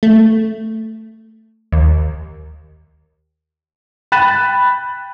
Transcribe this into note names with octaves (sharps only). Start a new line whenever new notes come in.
A3
D#2
G5 B5 F#6 A6 D#7 E7